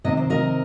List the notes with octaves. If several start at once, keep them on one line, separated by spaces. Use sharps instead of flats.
C3 D#3 C4 D#5
C5
A#4 D#5